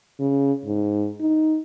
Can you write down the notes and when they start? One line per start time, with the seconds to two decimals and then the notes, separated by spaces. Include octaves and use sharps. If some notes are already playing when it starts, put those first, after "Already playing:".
0.19 C#3
0.65 G#2
1.20 D#4